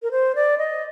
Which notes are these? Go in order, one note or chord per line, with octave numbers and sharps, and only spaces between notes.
A#4
C5
D5
D#5